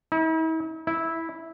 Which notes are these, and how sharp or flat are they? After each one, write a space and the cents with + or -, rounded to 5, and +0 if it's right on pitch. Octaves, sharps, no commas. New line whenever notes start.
E4 -45
E4 -10